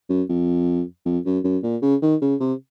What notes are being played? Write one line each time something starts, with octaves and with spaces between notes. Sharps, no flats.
F#2
F2
F2
F#2
F#2
A#2
C#3
D#3
C#3
C3